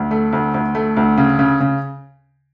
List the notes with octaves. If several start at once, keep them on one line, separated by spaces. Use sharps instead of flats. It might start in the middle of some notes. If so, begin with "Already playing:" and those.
Already playing: D2
A3
D2
D2
A3
D2
C#3
C#3
C#3